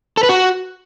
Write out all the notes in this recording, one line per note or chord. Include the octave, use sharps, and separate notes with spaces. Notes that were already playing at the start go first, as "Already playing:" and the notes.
A4
B4
F#4